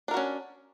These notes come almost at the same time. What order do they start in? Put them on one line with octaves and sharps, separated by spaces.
D4 A#4 F#4 C#4